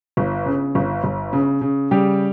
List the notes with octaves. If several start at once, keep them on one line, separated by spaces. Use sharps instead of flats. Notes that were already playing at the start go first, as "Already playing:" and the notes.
G1
C#3
G1
G1
C#3
C#3
C#3 G3 G4